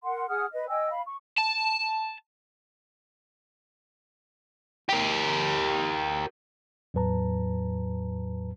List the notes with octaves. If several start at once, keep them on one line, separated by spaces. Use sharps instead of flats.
A#4 F#5 C6
G#4 F#5 D#6 F6
B4 D#5
D#5 G5 G#5 E6
F5 B5
C#6
A5
G4 A#4
E2 A2 F#3 B4 A5 A#5